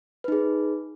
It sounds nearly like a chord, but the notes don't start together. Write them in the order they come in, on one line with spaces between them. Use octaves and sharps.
B4 D#4 G#4